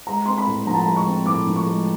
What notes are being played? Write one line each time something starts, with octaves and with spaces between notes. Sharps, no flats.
G#3 A#5
C4 C6
B5
A2
F3 A#5
A5
A#5
G#3
C#6
C4
A2 D6
F3
C#6
G#3